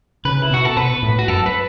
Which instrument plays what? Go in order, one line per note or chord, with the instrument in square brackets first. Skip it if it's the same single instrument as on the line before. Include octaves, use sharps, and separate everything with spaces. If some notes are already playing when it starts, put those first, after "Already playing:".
[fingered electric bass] C#3 [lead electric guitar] B4
[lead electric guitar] E4
[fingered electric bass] B2
[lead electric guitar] F#4
A4
[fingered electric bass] B2 [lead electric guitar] B4
[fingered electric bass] A2
[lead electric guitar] F#4
[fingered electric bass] F#2 [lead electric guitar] A4
[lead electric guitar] B4